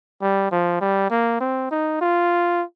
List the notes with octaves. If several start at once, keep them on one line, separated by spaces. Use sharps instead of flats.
G3
F3
G3
A#3
C4
D#4
F4